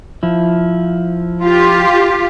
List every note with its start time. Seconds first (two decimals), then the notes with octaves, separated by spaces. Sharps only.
0.23 F3 E4
1.43 F4 G4